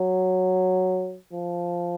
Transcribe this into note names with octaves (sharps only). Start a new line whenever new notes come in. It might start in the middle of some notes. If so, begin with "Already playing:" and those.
Already playing: F#3
F3